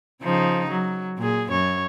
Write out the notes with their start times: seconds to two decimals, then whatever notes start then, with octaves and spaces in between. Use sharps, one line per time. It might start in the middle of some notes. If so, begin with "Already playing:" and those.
0.23 C#3 F3 D#4
0.70 F#3
1.17 A#2 G#4
1.50 F#2 C#5